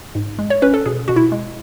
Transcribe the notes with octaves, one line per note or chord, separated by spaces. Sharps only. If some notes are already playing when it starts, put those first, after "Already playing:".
G#2
G#3
C#5
C#4 B4
A4
B2 G#4
B2 F#4
E4
G#3